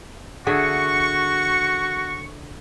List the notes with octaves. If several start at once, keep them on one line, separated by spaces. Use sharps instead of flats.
D3 F#4 G#4 E5 C#6